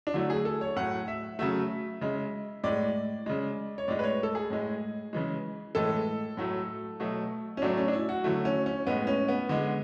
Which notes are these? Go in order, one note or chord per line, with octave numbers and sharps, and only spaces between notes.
D4
D3 F#3 A3 E4
G#4
A4
C#5
A2 F#3 A3 F#5
E5
C#3 F#3 A3 E5
C#3 G#3
A2 G#3 D5
C#3 G#3
C#5
A2 G#3 D5
B4
C#5
A4
G#4
A2 G#3
C#3 E3 G#3
A2 E3 G#3 A4
A2 F#3 A3
B2 F#3 A3
C#4
A2 F#3 A3 D4
C#4
D4
E4
F#4
D3 F#3 A3 E4
C#4
C#4
A2 G#3 B3
C#4
B3
D3 G#3